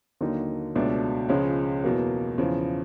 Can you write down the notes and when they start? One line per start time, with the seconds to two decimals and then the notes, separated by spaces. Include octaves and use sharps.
0.21 D#2 D3 F#3 A#3 D#4
0.75 C#2 B2 F#3 A3 D4
1.29 C#2 C#3 F3 G#3 C#4
1.84 E2 B2 F#3 A#3
2.38 E2 C#3 F3